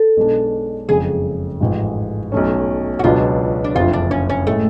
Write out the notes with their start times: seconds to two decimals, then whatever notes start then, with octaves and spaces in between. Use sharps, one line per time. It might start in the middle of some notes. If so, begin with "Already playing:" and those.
Already playing: A4
0.17 B1 B2 G#3 D4
0.88 F#1 F2 C#3 G#3 G#4
1.60 A1 G#2 F3 G#3
2.32 B1 B2 A3 C#4
2.99 F#4
3.04 C#2 B2 F#3 B3 D4 F4
3.64 D4
3.75 F#1 F2 D3 F3 F4
3.93 D4
4.11 C#4
4.30 C#4
4.47 A2 G#3 A3 C#4